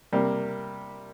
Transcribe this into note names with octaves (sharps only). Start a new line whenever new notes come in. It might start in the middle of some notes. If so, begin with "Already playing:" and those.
C3 G3 A#3